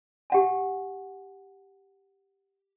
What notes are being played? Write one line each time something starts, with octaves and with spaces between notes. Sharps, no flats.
G4 F#5 G#5